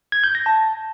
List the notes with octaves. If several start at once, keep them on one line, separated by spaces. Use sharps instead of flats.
G#6
G6
A#6
A5